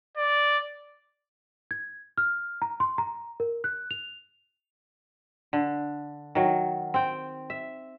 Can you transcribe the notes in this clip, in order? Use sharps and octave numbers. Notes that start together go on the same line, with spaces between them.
D5
G#6
F6
A#5
C6
A#5
A#4
F#6
F7
D3
D#3 F#3
C4 G5
E5